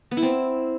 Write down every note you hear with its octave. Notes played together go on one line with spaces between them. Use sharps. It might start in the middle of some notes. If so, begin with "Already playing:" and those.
B3
E4
C4